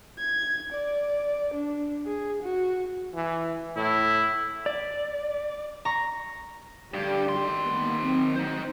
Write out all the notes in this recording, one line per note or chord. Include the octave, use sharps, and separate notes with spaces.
G#6
D5
D4
G#4
F#4
E3
A2 E4
D5
A#5 C#6
G2 D3 G4 D5
D#3 C6
A#3 B3
F#3 C4
D#4 C5